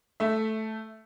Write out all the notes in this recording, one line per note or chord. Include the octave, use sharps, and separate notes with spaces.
A3 E5